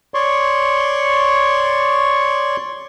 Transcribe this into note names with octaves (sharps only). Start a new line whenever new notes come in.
C#5 D5 C6 C#6